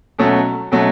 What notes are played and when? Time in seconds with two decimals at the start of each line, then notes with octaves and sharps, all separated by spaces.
0.19 B2 F#3 A3 C#4
0.72 B2 F#3 A3 C#4